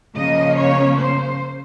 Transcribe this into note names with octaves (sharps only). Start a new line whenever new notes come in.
C#3 F3 A#3 C#4 D#5
C#5
C5